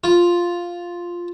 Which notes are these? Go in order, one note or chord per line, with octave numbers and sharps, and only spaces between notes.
F4